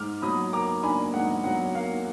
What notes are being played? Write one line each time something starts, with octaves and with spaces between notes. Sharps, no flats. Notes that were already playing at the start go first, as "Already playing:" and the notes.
Already playing: G#2 D6 F6
F#3 B5 D#6
A#3 A#5 D6
D4 G#5 B5
G#2 F#5
F#3 F#5
A#3 F5